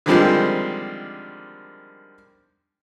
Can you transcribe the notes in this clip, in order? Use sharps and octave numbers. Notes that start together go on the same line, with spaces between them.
D3 D#3 F3 G3 G#3 C4